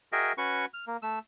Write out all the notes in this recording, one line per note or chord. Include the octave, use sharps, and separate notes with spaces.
F#4 G#4 A#4 D#5 E5 G5
C#4 F#4 B4 C#6
F6
A#3
A3 E6